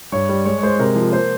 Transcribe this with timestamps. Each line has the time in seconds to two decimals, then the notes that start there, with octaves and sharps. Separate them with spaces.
0.12 G2 C#5
0.29 G3
0.45 G#3 C#5
0.59 C#5
0.63 G#3 C5
0.79 C3 A#4
0.96 F3
1.12 A#3 C5